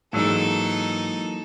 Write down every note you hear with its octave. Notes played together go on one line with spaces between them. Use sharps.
G#2 E3 F#3 A#3 D#4 A4 A5 E6